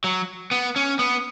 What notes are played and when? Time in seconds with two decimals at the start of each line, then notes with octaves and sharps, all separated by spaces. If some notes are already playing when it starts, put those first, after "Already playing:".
0.04 F#3
0.51 B3
0.76 C#4
0.99 B3